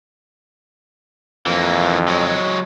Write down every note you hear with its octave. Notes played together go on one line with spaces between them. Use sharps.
F2 E3 A#3
F#3 G#3